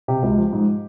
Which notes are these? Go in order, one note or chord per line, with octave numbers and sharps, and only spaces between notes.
C3 G4
C#2
F3
G#2